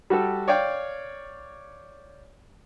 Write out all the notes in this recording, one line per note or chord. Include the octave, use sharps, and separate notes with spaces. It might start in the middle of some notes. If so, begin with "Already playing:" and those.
G3 F#4 G4 A4
C#5 D5 F5 G5